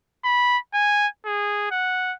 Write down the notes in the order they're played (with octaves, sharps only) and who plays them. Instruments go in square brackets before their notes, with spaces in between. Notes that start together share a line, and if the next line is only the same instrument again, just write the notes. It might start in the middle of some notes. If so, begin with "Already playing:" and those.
[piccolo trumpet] B5
G#5
G#4
F#5